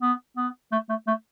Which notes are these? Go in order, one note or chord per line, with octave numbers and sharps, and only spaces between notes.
B3
B3
A3
A3
A3